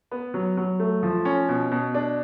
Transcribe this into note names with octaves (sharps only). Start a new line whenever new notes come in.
B3
F#3
F#3
A3
F3
C#4
B2
B2
D4